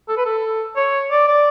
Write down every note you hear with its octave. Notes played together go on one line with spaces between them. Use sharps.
A4
B4
A4
C#5
D5
D5